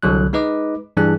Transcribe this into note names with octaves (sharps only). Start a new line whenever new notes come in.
C2 D3 F#3 F#6
G#3 D#4 B4 D#5 D6
G2 E3 G3 D4 G#4 F#6